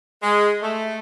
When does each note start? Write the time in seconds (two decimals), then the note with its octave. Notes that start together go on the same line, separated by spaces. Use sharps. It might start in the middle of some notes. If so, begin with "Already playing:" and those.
0.22 G#3
0.62 A3